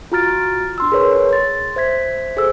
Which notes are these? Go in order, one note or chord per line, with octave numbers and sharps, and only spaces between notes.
F4 F#4 A#5 F6 A6 D7
D4 C6 E6
G#4 A#4 B4 C#5 A#5 C6
C6 A6
C5 E5 G#6 B6
G#4 A4 C5 E6